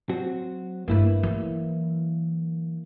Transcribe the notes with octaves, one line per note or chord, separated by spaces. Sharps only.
F#3 C4 F#4
G2 A3 A#3 E4 B4
E3 F#3